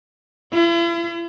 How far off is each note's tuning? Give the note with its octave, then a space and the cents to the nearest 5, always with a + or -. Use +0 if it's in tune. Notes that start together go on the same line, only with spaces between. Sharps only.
E4 +45